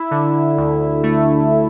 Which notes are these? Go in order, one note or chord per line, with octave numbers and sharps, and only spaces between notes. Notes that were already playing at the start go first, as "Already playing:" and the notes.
Already playing: E4
D3
D2
A3